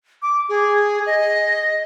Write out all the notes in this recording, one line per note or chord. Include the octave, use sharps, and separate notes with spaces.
D6
G#4
D#5